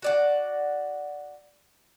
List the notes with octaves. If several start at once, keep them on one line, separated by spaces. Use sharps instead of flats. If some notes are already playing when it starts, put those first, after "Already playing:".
F#4 D5 F#5